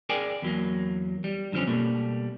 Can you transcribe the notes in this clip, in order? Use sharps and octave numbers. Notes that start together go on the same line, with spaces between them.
G#4 A#4 D5 G5 G#5
E2 F#3 A#3
G3
F#2 D3 F3 C4 C#4
B2 G3 A3 A#3